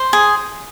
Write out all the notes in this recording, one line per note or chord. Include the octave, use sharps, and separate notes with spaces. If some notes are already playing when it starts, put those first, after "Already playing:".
Already playing: C5
G#4